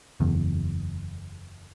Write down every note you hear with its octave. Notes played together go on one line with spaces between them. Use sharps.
F#1 E2